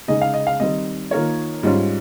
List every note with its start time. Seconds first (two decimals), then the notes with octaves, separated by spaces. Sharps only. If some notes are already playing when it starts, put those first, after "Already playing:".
0.08 C#3 G#3 D#4 G#4 D#5
0.21 F5
0.34 D#5
0.47 F5
0.60 D#3 G3 C4 D#5
1.11 D#3 A#3 F4 A#4 C#5
1.63 G#2 G3 C#4 F4 C5